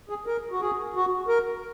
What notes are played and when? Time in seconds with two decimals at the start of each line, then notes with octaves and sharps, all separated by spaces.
0.09 G#4
0.27 A#4
0.51 F#4
0.61 G#4
0.95 F#4
1.28 A#4